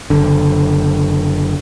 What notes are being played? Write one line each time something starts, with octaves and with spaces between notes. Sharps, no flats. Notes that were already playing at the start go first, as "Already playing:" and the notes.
F#1 D3